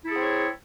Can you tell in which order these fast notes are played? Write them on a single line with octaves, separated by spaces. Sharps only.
E4 A4 G#4 C4 C#5